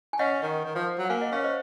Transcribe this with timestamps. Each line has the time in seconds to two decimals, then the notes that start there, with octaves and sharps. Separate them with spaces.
0.13 G#5
0.19 C#4 D#5 F#5
0.43 D#3
0.65 D#3
0.75 F3
0.99 F#3
1.05 F#5
1.09 A#3 F5 G#5
1.21 D#5 F#5
1.32 C#4 C#5 F5
1.44 C5 D#5